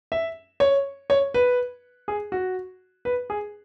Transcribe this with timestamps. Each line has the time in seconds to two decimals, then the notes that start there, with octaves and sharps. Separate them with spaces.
0.12 E5
0.60 C#5
1.10 C#5
1.34 B4
2.08 G#4
2.32 F#4
3.05 B4
3.30 G#4